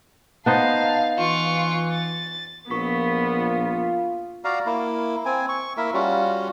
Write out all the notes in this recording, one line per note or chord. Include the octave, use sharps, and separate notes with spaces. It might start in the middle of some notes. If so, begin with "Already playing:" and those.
B3 D#4 C5 F5 A5
E3 F4 C#6
A6
A#1 B3 F4 A#4 C#6 B6
F#4 D5 F5 A#5
A#3 E4
C4 G#5
C#6
A#3 E4 A#4 E5
G3 C#4 F4 F#4